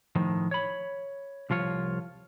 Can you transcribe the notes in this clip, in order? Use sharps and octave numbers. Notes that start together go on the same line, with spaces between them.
A2 D#3 F3
C#5 B5
C2 F3 F4 C#5